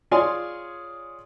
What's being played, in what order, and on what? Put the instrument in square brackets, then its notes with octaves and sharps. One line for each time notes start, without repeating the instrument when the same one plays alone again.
[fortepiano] F4 G#4 C#5 D5 G#5 C6